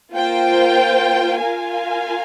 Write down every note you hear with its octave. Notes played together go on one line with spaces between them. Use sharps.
A#3 F4 C5 G5
F4 A#4 F5 G#5